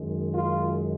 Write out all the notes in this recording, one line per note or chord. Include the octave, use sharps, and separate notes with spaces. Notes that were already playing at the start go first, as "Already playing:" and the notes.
Already playing: F#2 D#3 G#3
F4